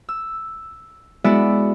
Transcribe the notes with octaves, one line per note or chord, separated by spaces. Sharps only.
E6
G#3 B3 E4 F#4 D5 E5